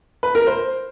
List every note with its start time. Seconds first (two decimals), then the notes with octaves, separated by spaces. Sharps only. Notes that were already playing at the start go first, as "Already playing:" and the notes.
0.23 B4
0.35 A#4
0.47 C5